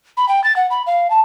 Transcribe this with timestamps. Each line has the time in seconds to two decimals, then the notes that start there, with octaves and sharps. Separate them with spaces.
0.17 B5
0.29 G5
0.44 A6
0.56 F#5
0.71 B5
0.87 F5
1.10 A5